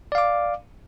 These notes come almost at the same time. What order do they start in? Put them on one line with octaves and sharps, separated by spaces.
D5 F5 D6